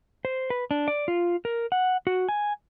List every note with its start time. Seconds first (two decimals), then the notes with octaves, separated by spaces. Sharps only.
0.25 C5
0.50 B4
0.71 D4
0.88 D5
1.08 F4
1.45 A#4
1.72 F#5
2.07 F#4
2.29 G#5